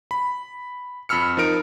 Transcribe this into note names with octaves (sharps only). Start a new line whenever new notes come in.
B5
F2 B5 E6 F6 C#7
F3 D#4 A#4 D7